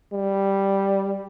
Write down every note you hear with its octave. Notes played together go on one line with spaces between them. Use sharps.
G3